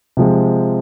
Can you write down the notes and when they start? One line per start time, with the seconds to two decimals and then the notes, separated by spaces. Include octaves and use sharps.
0.17 C3 F3 G#3